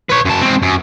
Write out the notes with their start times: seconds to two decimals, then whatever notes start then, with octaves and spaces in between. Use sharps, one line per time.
0.10 B4 C#5
0.26 F#2 A5
0.41 G#3 C4
0.62 F#2